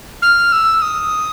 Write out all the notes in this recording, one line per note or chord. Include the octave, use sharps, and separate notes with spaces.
F6
E6
D#6